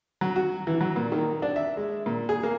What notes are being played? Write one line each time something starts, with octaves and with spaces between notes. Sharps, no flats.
F#3
F#4
E3
F#3
A#2
D#3
D4
E5
G#3
A#2
G#4
A#3